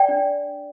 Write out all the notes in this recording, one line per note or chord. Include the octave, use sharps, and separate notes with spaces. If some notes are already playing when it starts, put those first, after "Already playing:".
Already playing: D5 G5
D4